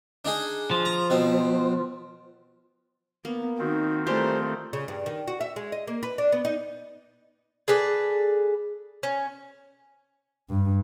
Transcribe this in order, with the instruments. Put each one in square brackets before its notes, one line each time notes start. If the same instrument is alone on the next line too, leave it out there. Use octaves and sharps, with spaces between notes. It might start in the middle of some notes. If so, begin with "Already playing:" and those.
[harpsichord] D4 D#4 G#4
[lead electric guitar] F3
[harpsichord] A#5
B2 C4
[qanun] A#3 [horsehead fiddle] B3
[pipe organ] D#3 C4 [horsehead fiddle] D#4 F#4
[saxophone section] E3 G3 C5 [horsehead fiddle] A3 [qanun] F4 G4 A#4
[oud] C#3
G2
D#3
F#4
E5
G#3
D#5
A#3
B4
D4
B3
D#4
[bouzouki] G#4 A4 B4 D5
C#4
[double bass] G2